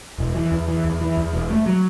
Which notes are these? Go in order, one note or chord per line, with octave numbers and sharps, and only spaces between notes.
E1
E3
E2
E3
E2
E3
E2
E1
A3
F#3